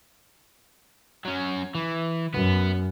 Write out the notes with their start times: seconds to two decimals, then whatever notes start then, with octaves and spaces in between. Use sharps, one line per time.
1.25 F#3 C#4
1.75 E3
2.34 F#2 B3 B4